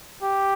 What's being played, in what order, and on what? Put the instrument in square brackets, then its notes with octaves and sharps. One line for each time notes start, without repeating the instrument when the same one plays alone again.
[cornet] G4